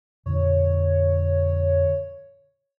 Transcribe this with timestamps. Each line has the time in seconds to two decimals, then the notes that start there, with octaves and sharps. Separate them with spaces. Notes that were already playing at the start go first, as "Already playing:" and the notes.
0.26 F2 A#2 D3 C#5